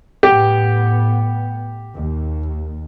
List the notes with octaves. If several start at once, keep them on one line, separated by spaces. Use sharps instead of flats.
A2 B3 G4
D#2